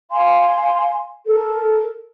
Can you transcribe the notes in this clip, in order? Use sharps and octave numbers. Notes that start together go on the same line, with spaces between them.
F5 G#5 C6
A4 A#4